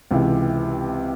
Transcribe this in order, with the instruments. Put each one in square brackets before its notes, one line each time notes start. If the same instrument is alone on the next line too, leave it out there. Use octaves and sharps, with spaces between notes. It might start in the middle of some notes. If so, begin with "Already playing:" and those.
[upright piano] C#2 C3 E3